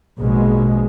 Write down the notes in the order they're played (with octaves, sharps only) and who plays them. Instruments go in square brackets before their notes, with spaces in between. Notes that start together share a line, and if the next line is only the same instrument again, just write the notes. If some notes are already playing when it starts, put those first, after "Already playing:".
[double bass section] A#1 B2 G#3